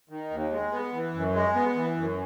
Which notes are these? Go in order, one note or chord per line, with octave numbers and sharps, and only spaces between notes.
D#3
D#2
G#3
B3
E3
F#2
G#3
B3
E3
F#2